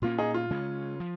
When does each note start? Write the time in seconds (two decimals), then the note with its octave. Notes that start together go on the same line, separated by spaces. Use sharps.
0.02 A#2 A#3 C#4 F4
0.18 D#4 G#4
0.34 F4
0.50 C#3 G#3 C#4
1.00 F3